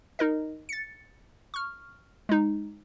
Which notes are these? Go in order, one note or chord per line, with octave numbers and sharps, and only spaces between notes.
D#4 A#4 D#5
A6 C#7
C#6 F6
G#3 D#4